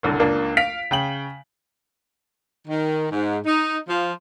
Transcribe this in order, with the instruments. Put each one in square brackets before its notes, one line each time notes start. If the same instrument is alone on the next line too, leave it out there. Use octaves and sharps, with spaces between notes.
[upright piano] F#1 C2 D3
C#2 A#3 D4
F5 B6 D7 F7
C#3 G5 F#7
[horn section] D#3
G#2
D#4
F3